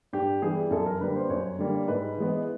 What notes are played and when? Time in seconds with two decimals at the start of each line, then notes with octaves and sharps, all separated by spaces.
0.13 G2 G4
0.42 E3 G3 B3 G#4
0.71 F#2 A4
0.86 A#4
1.00 D3 G3 A#3 B4
1.15 C5
1.29 F#2 C#5
1.59 D3 G3 A#3
1.88 G#2 B4
2.17 E3 G#3 B3